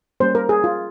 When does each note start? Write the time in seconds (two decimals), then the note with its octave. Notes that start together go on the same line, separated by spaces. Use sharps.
0.20 G3 A#3 C#4 C5
0.35 A#4
0.49 G#4
0.64 F4